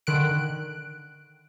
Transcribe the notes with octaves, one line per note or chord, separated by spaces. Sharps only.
D3 D#3 F#6 D7